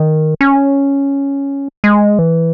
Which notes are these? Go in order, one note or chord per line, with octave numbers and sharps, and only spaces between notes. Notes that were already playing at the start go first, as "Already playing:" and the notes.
Already playing: D#3
C#4
G#3
E3